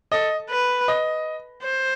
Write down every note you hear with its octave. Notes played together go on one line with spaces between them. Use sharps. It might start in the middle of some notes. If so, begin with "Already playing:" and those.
A4 D#5
B4
D#5
C5